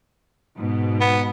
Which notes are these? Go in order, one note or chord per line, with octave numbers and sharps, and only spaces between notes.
G#2 B2
B3